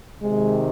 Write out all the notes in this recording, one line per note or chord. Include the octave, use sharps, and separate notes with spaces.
C3 D#3 G#3